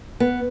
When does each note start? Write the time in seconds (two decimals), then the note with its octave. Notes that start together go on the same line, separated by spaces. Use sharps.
0.20 B3